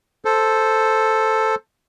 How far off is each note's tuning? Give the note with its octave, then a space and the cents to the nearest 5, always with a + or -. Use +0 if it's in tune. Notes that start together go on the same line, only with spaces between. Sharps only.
A4 +0 C5 +0